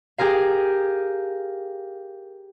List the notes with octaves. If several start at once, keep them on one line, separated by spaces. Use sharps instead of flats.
G4 G#4 A#4 F5